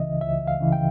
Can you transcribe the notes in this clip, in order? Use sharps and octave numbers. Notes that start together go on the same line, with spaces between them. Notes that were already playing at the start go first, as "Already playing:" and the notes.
Already playing: C#2 C#3 E3 D#5 E5
C#2 E5
F5
C#3 E3
G5